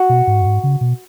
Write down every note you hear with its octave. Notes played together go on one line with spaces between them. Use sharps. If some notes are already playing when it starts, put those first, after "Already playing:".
Already playing: F#4
B2
G#2
F#2
G#2
C#3
B2